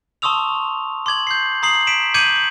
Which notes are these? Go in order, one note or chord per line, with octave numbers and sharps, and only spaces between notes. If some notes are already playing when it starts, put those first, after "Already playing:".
A5 C6 C#6 D#6 E6 F7
C6 D6 G#6 F#7
G6 C7
A#5 D#6 C7 F#7
B6 D7 E7
D6 G6 G#6 C#7 D#7 F#7